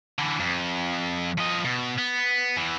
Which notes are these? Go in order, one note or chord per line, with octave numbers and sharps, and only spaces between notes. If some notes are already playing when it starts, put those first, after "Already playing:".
D3 E3
F2
F3 D#5
B2
B3
E2 E3